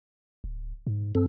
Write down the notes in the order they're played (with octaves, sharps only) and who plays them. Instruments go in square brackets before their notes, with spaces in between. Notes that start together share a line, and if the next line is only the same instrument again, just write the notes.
[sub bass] D1
G#2
[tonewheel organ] G2 C4 A4